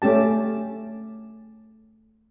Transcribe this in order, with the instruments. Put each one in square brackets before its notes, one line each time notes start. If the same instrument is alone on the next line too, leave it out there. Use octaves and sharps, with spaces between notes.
[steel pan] A3 C#4 G4 A5